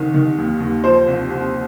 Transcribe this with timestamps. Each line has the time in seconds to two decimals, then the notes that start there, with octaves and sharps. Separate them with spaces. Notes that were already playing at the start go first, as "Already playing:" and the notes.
Already playing: C2 D#3
0.14 D#3
0.38 D#2
0.60 D#2
0.84 F3 C5
1.07 C2
1.30 C2